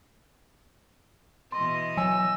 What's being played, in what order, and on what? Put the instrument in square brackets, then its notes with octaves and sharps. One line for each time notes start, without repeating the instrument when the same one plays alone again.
[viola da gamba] B2 E3 D#5 [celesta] C6
[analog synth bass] F#3 [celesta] G#5 [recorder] E6